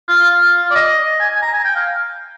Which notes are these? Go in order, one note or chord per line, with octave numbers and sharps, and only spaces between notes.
F4
F4
D5
D#5
G#5
G#5
A#5
G#5
G5
F5